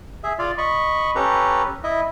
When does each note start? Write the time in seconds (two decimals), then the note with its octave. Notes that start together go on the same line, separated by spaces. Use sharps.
0.23 G#4 E5
0.39 F4 D5 F5
0.58 D#5 B5 C#6
1.15 C#4 G4 A4 B4 A#5
1.84 E4 D#5 E5